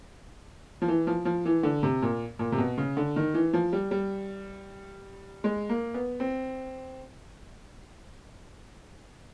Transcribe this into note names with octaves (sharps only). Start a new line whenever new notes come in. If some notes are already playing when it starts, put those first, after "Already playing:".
F3
E3
F3
F3
E3
D3
C3
A#2
A#2
C3
B2
C#3
D3
D#3
E3
F3
G3
G3
G#3
A#3
B3
C4